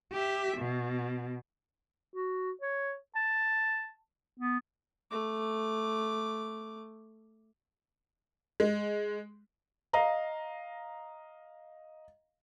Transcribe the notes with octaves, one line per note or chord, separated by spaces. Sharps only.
G4 E5
B2
F#4
C#5
A5
B3
A3 D6
G#3
D#5 F5 A#5